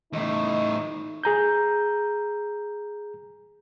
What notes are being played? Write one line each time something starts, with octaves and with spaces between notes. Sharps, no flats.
E2 A2 D#4
G#4 A#5 G6